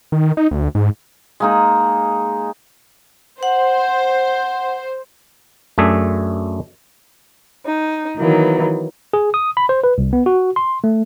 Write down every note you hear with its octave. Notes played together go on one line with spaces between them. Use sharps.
D#3
D#4
D2
G#2
G#3 A#3 D#4
C5 F#5
F#2 A3 D4 G#4 E5
D#4
D#3 E3 F#3 A#3 B3
G#4
D#6
B5
C5
B4
C2
B3
F#4
C6
A3